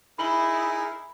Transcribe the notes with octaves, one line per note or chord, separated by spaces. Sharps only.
D#4 E4 G#4 A#4 B5 F#7 G7